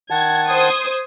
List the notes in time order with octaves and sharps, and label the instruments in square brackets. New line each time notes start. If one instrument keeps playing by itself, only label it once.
[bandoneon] D#3 F#5 A5 [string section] G#6
[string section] C5 D#6 G#6